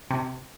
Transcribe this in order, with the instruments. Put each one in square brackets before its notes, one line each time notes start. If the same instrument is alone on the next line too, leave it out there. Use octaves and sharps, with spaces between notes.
[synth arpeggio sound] C3